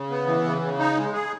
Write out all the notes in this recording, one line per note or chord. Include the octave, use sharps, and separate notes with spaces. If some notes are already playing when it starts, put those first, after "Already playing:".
Already playing: C#3
B3
E3
C#3
C#3
D#4
G#3
G#4